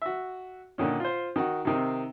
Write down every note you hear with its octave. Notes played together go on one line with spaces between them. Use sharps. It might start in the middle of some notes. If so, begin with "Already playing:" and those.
F#4 E5
A#2 D3 D#3 C#4
F4 C5
D#3 F#4
C3 D#3 C4